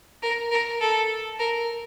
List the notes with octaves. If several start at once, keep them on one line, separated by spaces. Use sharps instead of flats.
A#4
A#4
A4
A#4